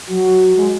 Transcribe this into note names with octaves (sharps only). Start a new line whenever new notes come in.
F#3 F#4
G#3